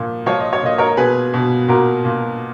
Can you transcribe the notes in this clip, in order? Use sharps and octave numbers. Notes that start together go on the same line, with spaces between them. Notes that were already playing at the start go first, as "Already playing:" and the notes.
Already playing: A#2 F3
F3 C#5
D#5
C#5
A#2 D#5
A#4 C#5
B2 G#4 B4
B2
A#2 F#4 A#4
A#2